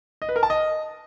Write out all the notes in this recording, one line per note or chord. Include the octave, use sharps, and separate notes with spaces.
D#5
B4
A#4
A5
D#5